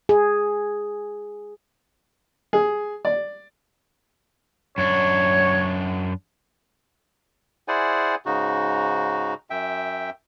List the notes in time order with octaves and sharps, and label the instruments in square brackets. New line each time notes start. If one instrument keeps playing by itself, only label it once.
[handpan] G#4
[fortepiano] G#4
D5
[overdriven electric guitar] F#2 D4 [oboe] C#5
[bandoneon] E4 G#4 C5 D5 F#5 G#5
G#2 C#3 D#4 F#4
F#2 E5 G5